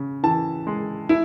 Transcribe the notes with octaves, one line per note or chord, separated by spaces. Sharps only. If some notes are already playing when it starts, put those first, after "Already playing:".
Already playing: C#3
E3 A5
G#3
E4